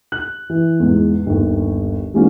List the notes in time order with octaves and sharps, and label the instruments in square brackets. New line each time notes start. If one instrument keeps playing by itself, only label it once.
[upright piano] F#6
E3
E2 G#2
G1 D#2
E3 G#3 A#3 C#4 D#4 F#4